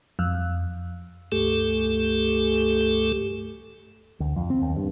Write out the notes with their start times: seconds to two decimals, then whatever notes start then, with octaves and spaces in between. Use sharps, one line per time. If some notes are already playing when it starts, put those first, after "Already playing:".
0.19 F2
1.32 C#2 G2 A3 G4 A4
4.20 D2
4.36 F2
4.50 C4
4.61 D#2
4.77 G2